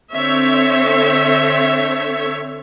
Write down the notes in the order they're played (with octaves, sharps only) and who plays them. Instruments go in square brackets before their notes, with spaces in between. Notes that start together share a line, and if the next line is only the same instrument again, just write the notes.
[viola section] D3 C4 C#5 E5